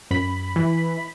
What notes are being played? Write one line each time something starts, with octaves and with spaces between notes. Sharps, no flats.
F#2 B5
E3